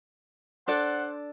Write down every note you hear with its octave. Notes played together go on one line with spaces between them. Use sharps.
D4 A4 C5 D5 F#5